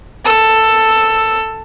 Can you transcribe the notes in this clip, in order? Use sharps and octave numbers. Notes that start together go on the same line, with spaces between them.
A4 E6